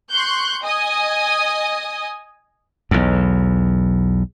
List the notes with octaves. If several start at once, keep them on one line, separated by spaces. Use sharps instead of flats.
C6 C#6 F#6 G6
D#5 G#5 D#6
B1 E2